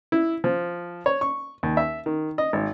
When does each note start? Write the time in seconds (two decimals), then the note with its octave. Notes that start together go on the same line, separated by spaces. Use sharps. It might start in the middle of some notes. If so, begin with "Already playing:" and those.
0.12 E4
0.44 F3
1.06 C#5
1.21 C#6
1.63 D#2
1.77 E5
2.06 D#3
2.38 D#5
2.53 G#1